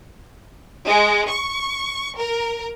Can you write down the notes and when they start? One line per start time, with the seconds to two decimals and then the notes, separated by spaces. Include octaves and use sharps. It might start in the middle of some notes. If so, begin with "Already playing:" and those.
0.87 G#3
1.29 C#6
2.18 A#4